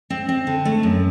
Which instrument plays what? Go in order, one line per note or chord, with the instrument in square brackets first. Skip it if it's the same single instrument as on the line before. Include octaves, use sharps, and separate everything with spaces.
[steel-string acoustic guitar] C4
C4
D3
A3
F#2